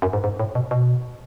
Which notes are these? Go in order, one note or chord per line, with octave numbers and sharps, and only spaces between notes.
F#2
G#2
G#2
A2
B2
B2